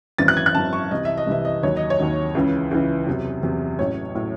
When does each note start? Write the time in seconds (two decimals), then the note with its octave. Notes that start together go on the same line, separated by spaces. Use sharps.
0.18 G#1 F#2 E3 A6
0.28 F#6
0.37 G#6
0.46 F#6
0.55 G#1 F#2 E3 A5
0.73 C#6
0.91 C2 C3 E3 D#5
1.05 E5
1.18 D#5
1.27 C2 C3 E3 E5
1.45 D#5
1.63 D#2 D#3 F#3 C#5
1.77 D#5
1.90 C#5
1.99 D#2 D#3 F#3
2.35 C#2 C#3 E3
2.71 C#2 C#3 E3
3.07 E2 C3 F#3
3.43 E2 C3 F#3
3.79 A1 A2 F#3 C#5
4.15 A2 F#3